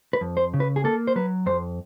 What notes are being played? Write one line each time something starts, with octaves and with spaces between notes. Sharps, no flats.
B4
F2
C5
C#3
B4
G#4
A#3 A4
C5
F#3 B4
F2 C5